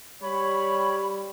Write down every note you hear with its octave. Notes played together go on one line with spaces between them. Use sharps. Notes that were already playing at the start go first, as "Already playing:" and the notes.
G3 C#5 B5